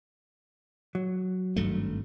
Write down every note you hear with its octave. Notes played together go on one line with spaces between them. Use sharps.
F#3
G#1 G2 A3